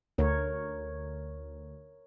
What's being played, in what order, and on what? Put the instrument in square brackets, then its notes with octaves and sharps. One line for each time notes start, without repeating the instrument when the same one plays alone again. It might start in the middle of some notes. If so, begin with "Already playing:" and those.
[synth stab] D2 [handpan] A#4 C#5